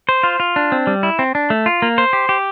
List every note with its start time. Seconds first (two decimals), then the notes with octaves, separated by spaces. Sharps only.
0.09 C5
0.23 F4
0.40 F4
0.56 D4
0.72 C4
0.87 G3
1.03 E4
1.19 C4
1.35 D4
1.50 A3
1.66 F4
1.82 A#3
1.98 C5
2.13 G4
2.29 G4